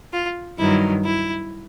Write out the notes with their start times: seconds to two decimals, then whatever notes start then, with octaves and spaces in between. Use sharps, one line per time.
0.13 F4
0.58 G2 D#3 F#3 E4
1.03 E4